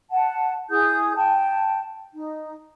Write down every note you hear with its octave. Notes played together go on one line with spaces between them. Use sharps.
F#5 A5
E4 G#4 D#6 G6
G5 A5
D#4